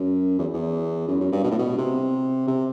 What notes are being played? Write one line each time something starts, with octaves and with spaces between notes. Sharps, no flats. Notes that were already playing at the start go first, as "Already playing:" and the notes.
Already playing: F#2
E2
E2
F#2
F#2
G2
B2
A2
B2
C3
C3